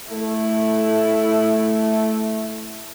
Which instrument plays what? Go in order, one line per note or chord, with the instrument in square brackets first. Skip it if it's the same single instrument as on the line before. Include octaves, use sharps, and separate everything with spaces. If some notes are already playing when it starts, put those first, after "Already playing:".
[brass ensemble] A3 [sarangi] E4